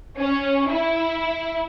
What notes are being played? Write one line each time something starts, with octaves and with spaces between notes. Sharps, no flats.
C#4
E4